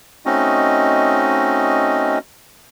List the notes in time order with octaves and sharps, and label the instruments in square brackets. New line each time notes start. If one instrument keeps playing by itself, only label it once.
[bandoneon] A3 C4 C#4 D#4 F#4 D#5